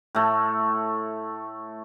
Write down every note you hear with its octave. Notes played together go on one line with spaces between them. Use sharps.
A2 A3